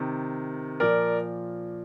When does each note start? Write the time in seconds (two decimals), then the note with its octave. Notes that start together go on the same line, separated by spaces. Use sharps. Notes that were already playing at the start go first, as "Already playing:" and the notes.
Already playing: C3 D#3
0.80 A#2 F3 A#4 D5